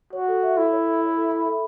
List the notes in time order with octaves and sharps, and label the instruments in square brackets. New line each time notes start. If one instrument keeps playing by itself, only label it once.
[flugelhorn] F#4 [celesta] C#5
[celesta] A4
E5
[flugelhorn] E4 [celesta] A4
[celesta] C#5
A4
E5
A4
B5
A4